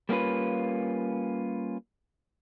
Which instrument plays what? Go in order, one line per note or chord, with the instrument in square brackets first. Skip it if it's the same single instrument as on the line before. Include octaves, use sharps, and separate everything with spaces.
[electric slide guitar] G3 A#3 C#4 F4 B4